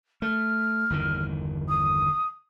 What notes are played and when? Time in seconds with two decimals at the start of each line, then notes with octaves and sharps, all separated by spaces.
0.22 A3 F6
0.90 G1 E2 D#3
1.68 D#6